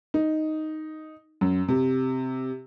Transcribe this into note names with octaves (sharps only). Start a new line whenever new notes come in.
D#4
F#2
C3